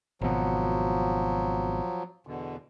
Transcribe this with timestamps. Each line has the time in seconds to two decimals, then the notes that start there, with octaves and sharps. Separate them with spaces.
0.21 G#1 B2 F3 F#3
2.27 E2 B2 D3